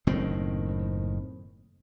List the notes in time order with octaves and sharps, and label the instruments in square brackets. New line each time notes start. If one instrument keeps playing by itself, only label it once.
[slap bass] F#1 A2 D#3 C4